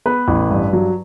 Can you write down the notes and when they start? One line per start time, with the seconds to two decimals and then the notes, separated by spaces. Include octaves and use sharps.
0.06 B3 B4
0.28 A1
0.50 G2
0.73 F#3